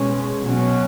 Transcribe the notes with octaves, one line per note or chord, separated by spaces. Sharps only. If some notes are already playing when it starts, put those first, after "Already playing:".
Already playing: B2 G#3 C#4
B2 F#3 C#4